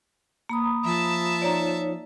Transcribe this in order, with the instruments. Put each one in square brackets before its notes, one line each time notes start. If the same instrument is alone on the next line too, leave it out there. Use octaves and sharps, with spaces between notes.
[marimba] A#3 [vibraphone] A#5 B5 D#6
[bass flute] F3 [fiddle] E5 A5
[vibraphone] D#4 C#5 [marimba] D5 A#5